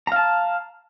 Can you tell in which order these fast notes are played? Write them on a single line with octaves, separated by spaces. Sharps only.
A#5 F5 A5